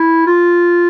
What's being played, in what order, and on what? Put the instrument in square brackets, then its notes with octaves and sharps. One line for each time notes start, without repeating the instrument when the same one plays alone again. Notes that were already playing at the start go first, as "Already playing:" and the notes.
Already playing: [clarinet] E4
F4